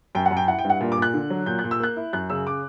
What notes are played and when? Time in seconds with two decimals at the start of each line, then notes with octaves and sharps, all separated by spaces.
0.15 F#2 G5
0.26 F#5
0.31 F#2
0.37 G5
0.48 E4 F#5
0.59 G5
0.64 G2
0.70 F#5
0.81 A#2
0.92 D6
0.98 A#2 F#6
1.14 D3
1.30 F#3
1.46 A#2 G6
1.59 F#6
1.64 A#2
1.71 E6
1.80 A#3 F#6
1.97 E4
2.13 F#2 F#6
2.30 C#3 E6
2.47 D6